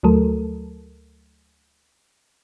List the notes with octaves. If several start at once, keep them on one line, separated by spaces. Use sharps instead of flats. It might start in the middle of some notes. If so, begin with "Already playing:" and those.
D2 F#3 A3 A4 A#4